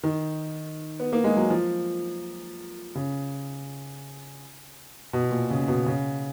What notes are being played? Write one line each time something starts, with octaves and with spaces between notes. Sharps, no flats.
D#3
B3
A#3
G#3
F#3
F3
C#3
B2
A#2
C#3
B2
C#3